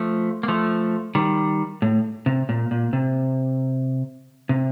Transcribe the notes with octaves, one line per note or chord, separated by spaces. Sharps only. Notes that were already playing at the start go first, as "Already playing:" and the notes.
Already playing: F3 A3
A#3
F3 A3
D#3 G3
A2
C3
A#2
A#2
C3
C3